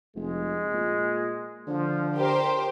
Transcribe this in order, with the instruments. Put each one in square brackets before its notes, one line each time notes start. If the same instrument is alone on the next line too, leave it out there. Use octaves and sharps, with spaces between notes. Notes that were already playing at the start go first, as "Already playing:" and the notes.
[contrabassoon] F1 [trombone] G#3
[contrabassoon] A#2
[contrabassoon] D3 [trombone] F3
[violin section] G4 C5 [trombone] A#4